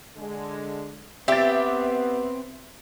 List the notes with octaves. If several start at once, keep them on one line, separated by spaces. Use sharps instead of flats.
D3 G#3
B3 C4 G4 B4 E5 A6